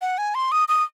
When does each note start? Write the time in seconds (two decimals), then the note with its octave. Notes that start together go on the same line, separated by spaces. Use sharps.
0.02 F#5
0.18 G#5
0.35 C6
0.52 D#6
0.68 D#6